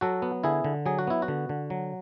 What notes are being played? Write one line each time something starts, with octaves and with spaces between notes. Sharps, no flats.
F#3 F#4 A4
B3
D3 E4 G#4
D3
F#3 G#4
F#4
B3 E4
F#4
D3
D3
F#3